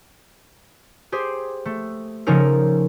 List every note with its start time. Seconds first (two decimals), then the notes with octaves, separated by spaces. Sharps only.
1.12 G4 G#4 C5
1.65 A3
2.27 C#3 F3 C#4 D#4 A4 A#4